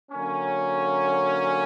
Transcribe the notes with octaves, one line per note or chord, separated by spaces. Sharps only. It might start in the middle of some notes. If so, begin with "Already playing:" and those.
D3 F#3 A#3 C#4